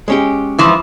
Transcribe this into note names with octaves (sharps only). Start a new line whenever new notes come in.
G#3 C#4 G4
E3 F3